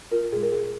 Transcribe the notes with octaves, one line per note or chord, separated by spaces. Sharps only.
F4 A#4
A#2 G#3 G#4
A#4
G#4